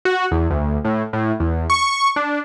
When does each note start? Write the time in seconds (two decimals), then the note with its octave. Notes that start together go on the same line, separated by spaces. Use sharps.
0.05 F#4
0.32 E2
0.51 D2
0.85 A2
1.13 A2
1.40 E2
1.70 C#6
2.16 D4